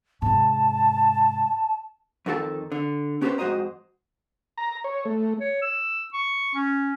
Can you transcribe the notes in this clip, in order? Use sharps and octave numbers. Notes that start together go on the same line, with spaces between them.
G#2 C3 A5
F2 D#3 A#3 F#4 A4 A5
D3
B3 C#4 G4 A4 B4 C5
F2 G#2 F#4 C5 D#5 A#5
A#5
C#5
A3
C#5
E6
C#6
C#4